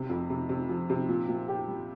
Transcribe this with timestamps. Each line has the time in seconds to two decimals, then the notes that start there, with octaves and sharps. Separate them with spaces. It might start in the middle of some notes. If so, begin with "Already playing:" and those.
Already playing: C3
0.10 F2
0.30 C3
0.49 C3
0.69 F3
0.90 C3
1.09 A#2
1.29 A#2
1.48 G4
1.68 G3